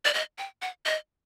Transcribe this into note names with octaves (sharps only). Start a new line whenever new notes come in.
D5
D#5
G5
F#5
D#5